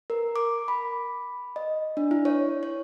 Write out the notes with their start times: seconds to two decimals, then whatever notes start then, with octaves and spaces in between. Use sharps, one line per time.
0.10 A#4
0.36 D6
0.68 B5
1.56 D#5
1.97 D4
2.11 E4
2.25 C#5
2.63 C#5